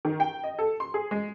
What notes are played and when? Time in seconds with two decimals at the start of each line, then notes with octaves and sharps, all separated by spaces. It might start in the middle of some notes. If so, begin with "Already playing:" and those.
0.05 D#3
0.20 G5
0.44 D#5
0.59 A4
0.80 C6
0.94 G#4
1.11 G#3